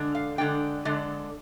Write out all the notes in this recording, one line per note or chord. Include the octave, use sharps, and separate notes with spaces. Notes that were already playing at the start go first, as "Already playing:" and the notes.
Already playing: D3 G#3 D4
F5
D3 G#3 D4 G5
D3 G#3 D4